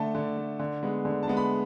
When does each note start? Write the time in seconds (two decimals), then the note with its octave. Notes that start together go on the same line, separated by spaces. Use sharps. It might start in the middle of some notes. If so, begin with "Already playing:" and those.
Already playing: D3 A3 A5
0.15 D3
0.37 A3
0.59 D3
0.83 G#3 B3
1.05 D3
1.23 A5
1.28 G#3 B3
1.37 B5